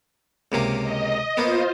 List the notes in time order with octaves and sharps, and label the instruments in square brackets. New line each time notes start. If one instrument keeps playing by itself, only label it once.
[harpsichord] C#2 C3 A#3
[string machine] D#5
[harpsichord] A#3 B3 [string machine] F4 C5